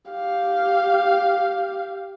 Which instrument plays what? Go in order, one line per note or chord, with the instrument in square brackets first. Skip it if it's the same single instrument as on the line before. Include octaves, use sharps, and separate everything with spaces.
[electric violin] G4 F5